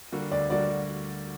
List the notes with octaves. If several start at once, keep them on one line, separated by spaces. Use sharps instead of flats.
D3 G3 A#3 F#4
D2 D5
D3 G3 A#3 F#4 D5